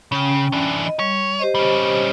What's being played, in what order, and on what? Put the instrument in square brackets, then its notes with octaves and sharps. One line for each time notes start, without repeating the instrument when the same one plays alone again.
[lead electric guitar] C#3 [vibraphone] C#4 G5
[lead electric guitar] E3 D4
[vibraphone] D#5
[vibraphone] G3 [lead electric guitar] C#5
[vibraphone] G4 C5 D#5
[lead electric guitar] G3 C#4